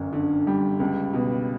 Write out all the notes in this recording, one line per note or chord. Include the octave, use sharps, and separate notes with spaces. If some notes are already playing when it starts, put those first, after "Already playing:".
Already playing: G1 F#2
D3
G3
C#2
B2